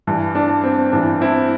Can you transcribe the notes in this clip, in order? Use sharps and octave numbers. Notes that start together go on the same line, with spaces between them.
G2 E3
D4
C4
G2 E3 D4
C4 E4